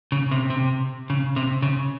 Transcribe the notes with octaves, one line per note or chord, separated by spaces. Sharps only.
C#3
C3
C3
C#3
C3
C#3